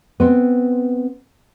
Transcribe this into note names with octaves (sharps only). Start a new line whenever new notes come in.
B3 C4